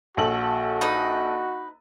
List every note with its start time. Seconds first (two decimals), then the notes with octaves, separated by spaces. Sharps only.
0.17 A#1 F#4 A4 F#7
0.81 D#4 B4 D#5